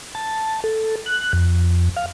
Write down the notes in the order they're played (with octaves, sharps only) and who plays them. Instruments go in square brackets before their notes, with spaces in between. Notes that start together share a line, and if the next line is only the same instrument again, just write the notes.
[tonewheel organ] A5
A4
F#6
F2
F5